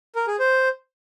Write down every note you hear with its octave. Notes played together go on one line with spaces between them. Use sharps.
A#4
G#4
C5